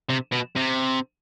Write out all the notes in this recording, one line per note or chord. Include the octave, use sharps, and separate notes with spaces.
C3
B2
C3